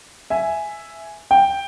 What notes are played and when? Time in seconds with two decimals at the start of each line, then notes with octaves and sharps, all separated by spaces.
0.30 E5 G#5
1.31 G5